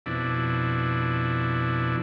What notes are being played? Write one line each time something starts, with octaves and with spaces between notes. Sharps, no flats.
F2 B2 D4 E4